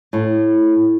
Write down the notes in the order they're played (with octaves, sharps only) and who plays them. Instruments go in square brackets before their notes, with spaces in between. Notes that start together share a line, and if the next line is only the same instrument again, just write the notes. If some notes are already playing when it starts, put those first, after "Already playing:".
[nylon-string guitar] A2